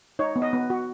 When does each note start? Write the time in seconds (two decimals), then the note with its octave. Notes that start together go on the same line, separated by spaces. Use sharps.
0.19 D#4 C#5
0.36 B3
0.42 D#5
0.53 B3
0.70 F#4